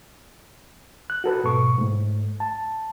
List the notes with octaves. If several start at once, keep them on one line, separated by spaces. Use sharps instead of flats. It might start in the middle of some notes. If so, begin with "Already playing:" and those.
F#6
F#4 A4 B4
G#2 B2 C#6
G#2 A3
A5